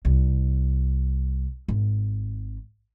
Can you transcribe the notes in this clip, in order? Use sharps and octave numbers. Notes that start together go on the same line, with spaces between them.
C2
G#1